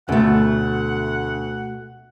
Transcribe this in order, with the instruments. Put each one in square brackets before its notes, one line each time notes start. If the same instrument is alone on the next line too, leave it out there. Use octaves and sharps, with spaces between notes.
[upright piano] D2 [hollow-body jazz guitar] B2 A3 [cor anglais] F#5